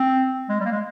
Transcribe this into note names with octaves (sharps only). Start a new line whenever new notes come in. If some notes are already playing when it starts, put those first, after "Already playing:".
Already playing: C4
G#3
G3
A#3
G#3